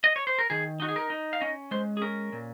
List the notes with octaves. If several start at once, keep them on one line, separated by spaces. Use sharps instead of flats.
D#5
C#5
C5
A#4
D#3 G#4
D#4 F#4
G#4
A#4
D#4
F5
C#4 D#5
G#3 C5
G#4
C#4 A#4
A#2